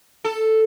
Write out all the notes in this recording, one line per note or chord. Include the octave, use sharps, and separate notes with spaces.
A4